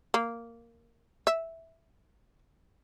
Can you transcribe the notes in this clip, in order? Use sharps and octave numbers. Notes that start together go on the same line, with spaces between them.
A#3
E5